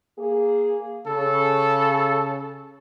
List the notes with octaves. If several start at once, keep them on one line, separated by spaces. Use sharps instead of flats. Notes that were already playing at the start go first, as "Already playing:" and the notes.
A#3 G#4
C#3 A4